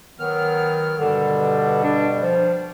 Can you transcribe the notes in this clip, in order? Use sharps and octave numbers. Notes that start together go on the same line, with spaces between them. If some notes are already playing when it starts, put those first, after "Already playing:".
D#3 F#3 B3 F6
G2 B2 D3 G3
D4
F3